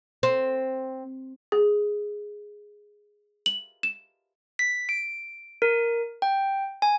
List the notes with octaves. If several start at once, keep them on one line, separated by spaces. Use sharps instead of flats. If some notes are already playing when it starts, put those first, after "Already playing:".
C4
G#4
F#7
E7
B6
D7
A#4
G5
G#5